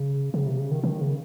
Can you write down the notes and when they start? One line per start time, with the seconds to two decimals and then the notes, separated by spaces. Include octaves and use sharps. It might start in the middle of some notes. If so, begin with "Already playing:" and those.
Already playing: C#3
0.34 C#3
0.46 C3
0.59 C#3
0.71 D#3
0.84 D#3
1.01 C#3